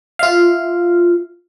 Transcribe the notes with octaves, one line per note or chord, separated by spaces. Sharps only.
F4 E5 F5